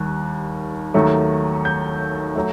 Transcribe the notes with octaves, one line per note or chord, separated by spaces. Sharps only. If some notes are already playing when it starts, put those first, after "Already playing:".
Already playing: D#2 D#3 G3 F#6
D#2 D#3 F#3 A3
G6
F#3 A3